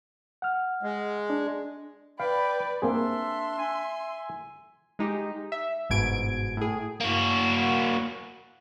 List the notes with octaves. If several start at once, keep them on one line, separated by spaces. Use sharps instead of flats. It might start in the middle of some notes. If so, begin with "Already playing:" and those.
F#5 F6
G#3
D4
B4 D5 F5 G5 B5
A#3 C4 D4 G#4 E5 C6
G#5
G#3 D#4 G4
E5
G1 G#2 B2 G#6 D7
A2 G#4
A#3 F#4